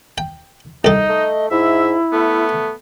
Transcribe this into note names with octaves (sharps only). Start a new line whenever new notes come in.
G5
C2 D#4 A4 D#5
A3
G#2 E4 E5
A3 B3